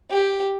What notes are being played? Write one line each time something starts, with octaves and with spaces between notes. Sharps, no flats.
G4